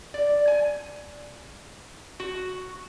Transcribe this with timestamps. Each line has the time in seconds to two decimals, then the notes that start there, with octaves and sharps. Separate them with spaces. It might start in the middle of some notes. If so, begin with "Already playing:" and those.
0.14 D5
0.47 G#5
2.20 F#4